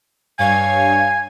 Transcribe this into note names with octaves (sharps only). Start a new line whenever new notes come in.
G2 C#5 F5 G#5 G#6